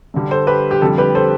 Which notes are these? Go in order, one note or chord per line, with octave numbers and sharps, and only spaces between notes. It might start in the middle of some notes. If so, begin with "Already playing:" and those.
G2 D3 G3
A4 C5
G4 B4
G4
F2 D3 G3 A4
G4 B4
A4 C5